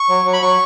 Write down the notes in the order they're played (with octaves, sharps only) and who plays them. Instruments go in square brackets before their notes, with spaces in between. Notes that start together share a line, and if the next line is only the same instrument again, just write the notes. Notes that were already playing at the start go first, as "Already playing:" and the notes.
Already playing: [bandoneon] C#6
F#3
F#3
B5
F#3 C#6